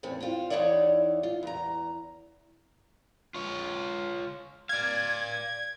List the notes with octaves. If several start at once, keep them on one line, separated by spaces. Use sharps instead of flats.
E2 A2 C4 C#4
C4 F4
E2 G2 D#4 C#5 D5 E5
F4
E2 A#5
F4 C#5
D5 F5 G#6